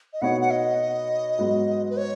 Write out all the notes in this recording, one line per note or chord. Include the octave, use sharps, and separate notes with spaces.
D#5
B2 B3 D#4 F#4 C#5 F#5
F#5
D#5
G#2 F#3 B3 F#4
B4
C#5